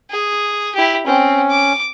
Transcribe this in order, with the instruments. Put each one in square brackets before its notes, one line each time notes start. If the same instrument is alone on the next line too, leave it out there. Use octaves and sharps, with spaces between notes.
[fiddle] G#4
E4 G4
[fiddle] C4 [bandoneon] C#4
[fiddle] D6